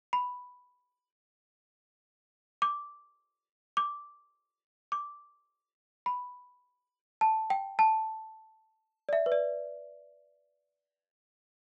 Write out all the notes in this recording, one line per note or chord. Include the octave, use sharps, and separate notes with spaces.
B5
D6
D6
D6
B5
A5
G5
A5
D5
E5
B4
D5